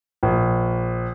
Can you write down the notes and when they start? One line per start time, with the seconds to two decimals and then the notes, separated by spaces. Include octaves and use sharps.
0.23 A#1